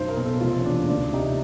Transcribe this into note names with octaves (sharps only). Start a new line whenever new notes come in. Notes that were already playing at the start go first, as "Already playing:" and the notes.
Already playing: B1 F#2 C5
A#4
B2
A4
F1 F4
C#4
E2 D4
D2 D4
C3 D#4